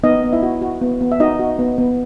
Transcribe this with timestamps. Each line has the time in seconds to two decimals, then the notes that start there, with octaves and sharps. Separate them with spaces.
0.03 B3 D#4 D#5
0.23 B3
0.33 E4 E5
0.42 F#4
0.62 F#4
0.82 B3
1.01 B3
1.12 E5
1.20 D#4 F#4 D#5
1.39 F#4
1.59 B3
1.78 B3